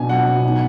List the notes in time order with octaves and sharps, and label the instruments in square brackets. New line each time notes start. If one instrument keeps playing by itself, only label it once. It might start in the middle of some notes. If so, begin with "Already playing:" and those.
Already playing: [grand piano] B2 D4 [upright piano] G#5
[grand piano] F#3 [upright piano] F#5
[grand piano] B2
D#4